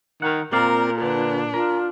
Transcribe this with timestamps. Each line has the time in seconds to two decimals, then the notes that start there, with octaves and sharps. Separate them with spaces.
0.22 D#3 A#4 F#5
0.53 A#2 C4 A#4 D5 F5 A#5
1.02 D3 D4 B4
1.54 F4 A#4